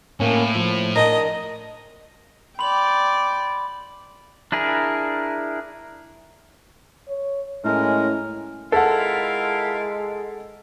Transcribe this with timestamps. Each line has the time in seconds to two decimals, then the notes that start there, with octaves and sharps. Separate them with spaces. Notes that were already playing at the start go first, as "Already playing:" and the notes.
0.20 A2 A#3 C#4
0.55 F3
0.96 D4 A#4 D#5
2.59 D5 G5 B5 C6 F#7
4.52 D4 E4 G#4 A#4
7.08 C#5
7.65 A2 G#3 C#4 A#4
8.72 G#3 E4 F4 A4 A#4 F#5